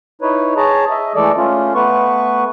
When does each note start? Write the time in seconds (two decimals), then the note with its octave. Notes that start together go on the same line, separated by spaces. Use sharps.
0.22 D#4 E4 B4 C#5
0.57 G#4 C#5 A5 A#5
0.90 D#5 E5
1.16 E3 G#3 A3 A4 D5
1.37 A3 C#4 F4
1.75 A3 B3 B4 C#6